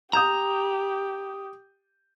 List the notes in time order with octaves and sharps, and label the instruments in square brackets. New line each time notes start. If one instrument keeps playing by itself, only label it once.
[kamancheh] G4 [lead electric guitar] A#5 [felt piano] D#6 G6 E7